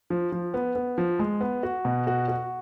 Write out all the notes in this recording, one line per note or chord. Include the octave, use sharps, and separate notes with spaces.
F3
F3
B3
B3
F3
G#3
B3
F#4
B2
F#4
F#4